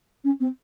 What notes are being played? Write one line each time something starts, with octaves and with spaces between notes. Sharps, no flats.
C#4
C4